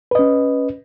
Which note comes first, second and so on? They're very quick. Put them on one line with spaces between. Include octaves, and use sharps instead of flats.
B4 D#5 C#4